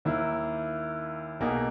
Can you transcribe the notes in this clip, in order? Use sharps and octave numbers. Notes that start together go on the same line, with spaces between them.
D#2 D#3 A#3 E4
B1 B2 A#3 D#4 G#4